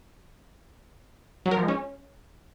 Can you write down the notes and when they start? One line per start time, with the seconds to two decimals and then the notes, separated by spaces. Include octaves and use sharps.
1.46 F#3
1.51 A#4
1.57 F3
1.63 G#3
1.68 C#4